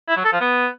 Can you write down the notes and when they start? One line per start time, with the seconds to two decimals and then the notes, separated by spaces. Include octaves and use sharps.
0.08 E4
0.16 F#3
0.24 A4
0.33 F3
0.41 B3